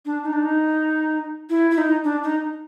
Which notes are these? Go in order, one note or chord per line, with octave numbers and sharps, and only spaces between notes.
D4
D#4
D4
D#4
E4
E4
D#4
D4
D#4